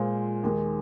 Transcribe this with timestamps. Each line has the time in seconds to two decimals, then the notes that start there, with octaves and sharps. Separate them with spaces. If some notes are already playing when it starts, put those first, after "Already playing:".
Already playing: A#2 G#3 F4 C5
0.43 D#2 D#3 G#3